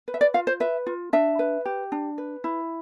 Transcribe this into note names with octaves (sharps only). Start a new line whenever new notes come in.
B4
E5
D5
F4 F5
C5
B4 E5
F4
D4 E5
B4
G4
D4
B4
E4